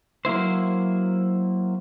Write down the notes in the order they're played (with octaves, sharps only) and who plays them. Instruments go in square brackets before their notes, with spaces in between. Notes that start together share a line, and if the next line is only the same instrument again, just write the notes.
[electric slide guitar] F#3 A#3 E4 C5